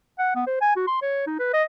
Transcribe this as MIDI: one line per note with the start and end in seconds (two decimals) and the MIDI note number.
0.19 0.33 78
0.35 0.44 59
0.47 0.60 72
0.61 0.74 80
0.76 0.84 66
0.87 0.99 84
1.02 1.22 73
1.27 1.37 63
1.39 1.49 71
1.53 1.63 75